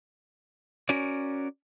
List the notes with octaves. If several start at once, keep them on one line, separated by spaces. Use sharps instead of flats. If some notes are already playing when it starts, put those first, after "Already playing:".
C#4 F#4 A#4 C#5 D5